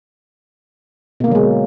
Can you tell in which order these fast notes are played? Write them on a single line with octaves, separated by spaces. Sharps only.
B2 A#3 D3 F#3 G#3